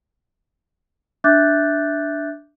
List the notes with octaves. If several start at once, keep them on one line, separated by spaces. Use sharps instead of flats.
D4 E5 D6 F#6 G6 A6